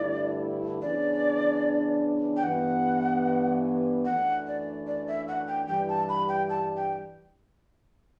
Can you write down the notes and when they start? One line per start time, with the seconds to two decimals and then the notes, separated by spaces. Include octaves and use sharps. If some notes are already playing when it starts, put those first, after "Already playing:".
Already playing: G2 D3 A3 E4 D5
0.81 C#3 E3 B3 D4 D5
2.37 G5
2.43 G2 E3 B3 F#5
4.05 F#2 E3 A3 D4 F#5
4.47 D5
4.87 D5
5.07 E5
5.28 F#5
5.48 G5
5.67 G2 E3 G3 G5
5.89 A5
6.09 B5
6.29 G5
6.50 A5
6.76 G5